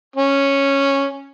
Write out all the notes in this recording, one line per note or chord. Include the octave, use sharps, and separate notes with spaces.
C#4